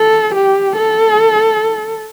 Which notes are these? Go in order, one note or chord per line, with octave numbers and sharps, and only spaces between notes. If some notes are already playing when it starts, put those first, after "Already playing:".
Already playing: A4
G4
A4